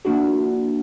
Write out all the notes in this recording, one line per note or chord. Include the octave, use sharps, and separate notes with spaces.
F3 A#3 D4 E4 F#4